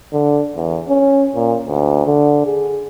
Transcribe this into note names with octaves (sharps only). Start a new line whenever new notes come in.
D3
E2
C#4
A#2
D2
D3
G#4